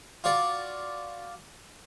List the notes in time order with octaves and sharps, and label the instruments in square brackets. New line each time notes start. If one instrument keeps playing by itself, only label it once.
[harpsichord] F4 F#4 D5